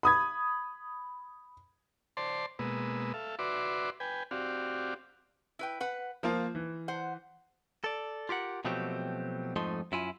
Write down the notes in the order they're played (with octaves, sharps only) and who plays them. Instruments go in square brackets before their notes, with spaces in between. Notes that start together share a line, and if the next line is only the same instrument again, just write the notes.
[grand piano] B5 D#6 G#6
[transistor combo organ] C5 D5 A5 C6
B2 G#3 A#3 B4 D#6 E6
A4 E5 F5
F#4 B4 D5 E5 C6 D6
B4 G5 G#5
C4 F#4 G4 D5 F5
[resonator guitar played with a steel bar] E4 B4 G5
B4 F#5
[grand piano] F3 A#3 F4 [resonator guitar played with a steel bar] C5
[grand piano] E3
[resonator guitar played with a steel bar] C5 F#5
[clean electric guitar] A4 D5
F4 G4 A#4 F#5
B2 F3 F#3 A3 C4 G4
F2 G#2 F3 A3 D#4 C6
F#2 E4 F4 G#5